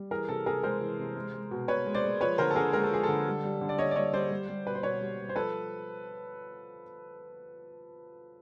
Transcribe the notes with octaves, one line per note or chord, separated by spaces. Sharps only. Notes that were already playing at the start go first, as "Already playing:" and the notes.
Already playing: G3
E3 G#4 A#4
C3 A4
C3 G#4 A#4
G#3 A#4 C5
E3
C3
G#3
G#3
B2
B2 B4 C#5
G#3
C5 D5
G#3
F3 B4 C#5
D3 A#4 C5
A4
D3 G#4 A#4
G#3 A#4
A4
F3 G#4
A4
D3
G3
G3
D3
D5
D3 C#5 D#5
D5
G3 C#5 D#5
G3 C5 D5
G3
G3
B2 B4
C5
B2 B4 C#5
G3
G3
C5
F3 A4 B4